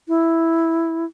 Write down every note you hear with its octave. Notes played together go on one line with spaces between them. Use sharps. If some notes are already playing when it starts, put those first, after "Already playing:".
E4